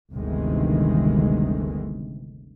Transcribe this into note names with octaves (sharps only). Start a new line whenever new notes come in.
G1 D2 C3 D#3 E3 G#3